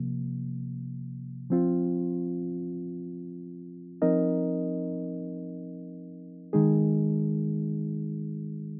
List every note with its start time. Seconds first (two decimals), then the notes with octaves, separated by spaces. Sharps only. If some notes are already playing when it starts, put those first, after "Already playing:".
Already playing: C3 F3 A#3
1.50 F3 C4 F4
4.02 F3 C4 D#4 A#4 D#5
6.53 D#3 G#3 D#4 G#4